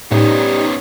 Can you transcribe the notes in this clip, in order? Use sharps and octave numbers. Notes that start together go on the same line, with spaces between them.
A2 G3 B3 C#4 D#4